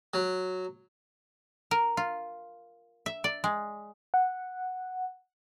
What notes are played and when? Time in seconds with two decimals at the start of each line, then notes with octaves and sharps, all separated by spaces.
0.14 F#3
1.71 A#4
1.97 F4
3.06 E5
3.24 D5
3.44 G#3
4.14 F#5